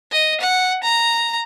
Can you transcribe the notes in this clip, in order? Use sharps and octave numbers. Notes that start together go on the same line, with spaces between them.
D#5
F#5
A#5